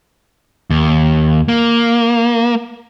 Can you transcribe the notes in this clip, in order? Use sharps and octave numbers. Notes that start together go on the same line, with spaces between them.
D#2
A#3